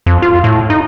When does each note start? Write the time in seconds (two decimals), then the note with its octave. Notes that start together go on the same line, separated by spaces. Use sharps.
0.06 F2
0.22 F4
0.44 A2
0.70 D#4